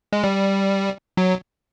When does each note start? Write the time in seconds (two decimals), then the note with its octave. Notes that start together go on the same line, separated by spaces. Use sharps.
0.13 G#3
0.24 G3
1.17 F#3